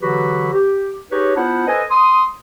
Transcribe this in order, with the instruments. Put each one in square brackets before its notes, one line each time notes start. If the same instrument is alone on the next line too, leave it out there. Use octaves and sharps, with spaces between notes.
[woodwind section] D3 E3 F#3 F#4 G4 B4
G4
D#4 G4 G#4 B4 C#5
B3 D4 E4 F4 C5 F#5
A4 B4 C5 D#5 G#5
C6 D#6